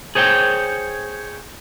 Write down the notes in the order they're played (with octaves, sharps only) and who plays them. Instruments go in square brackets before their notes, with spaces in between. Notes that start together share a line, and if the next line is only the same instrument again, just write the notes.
[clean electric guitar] G#4 C5 C#5 F#5 G5